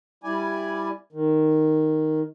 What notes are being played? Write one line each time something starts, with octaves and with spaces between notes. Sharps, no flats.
G3 E4 D5 G#5
D#3